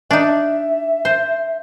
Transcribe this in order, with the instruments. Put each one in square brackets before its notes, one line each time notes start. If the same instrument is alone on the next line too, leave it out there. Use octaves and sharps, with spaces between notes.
[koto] D4 D#4 [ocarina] E5
[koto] C5